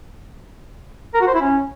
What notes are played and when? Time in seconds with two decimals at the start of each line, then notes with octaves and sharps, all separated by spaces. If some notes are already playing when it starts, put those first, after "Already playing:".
1.14 A#4
1.21 F#4
1.27 C5
1.34 E4
1.41 C#4